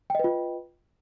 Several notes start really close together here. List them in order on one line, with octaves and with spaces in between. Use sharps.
G5 D#5 B4 F4